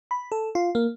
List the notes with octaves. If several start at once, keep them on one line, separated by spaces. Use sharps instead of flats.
B5
A4
F4
A#3